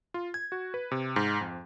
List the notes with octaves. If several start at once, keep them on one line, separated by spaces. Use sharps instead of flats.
F4
G#6
F#4
B4
C3
G#2
F2